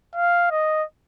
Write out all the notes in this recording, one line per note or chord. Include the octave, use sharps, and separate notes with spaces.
F5
D#5